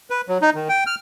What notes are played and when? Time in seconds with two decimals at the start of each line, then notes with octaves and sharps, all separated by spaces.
0.10 B4
0.28 F#3
0.42 D#4
0.55 D#3
0.69 G5
0.87 F6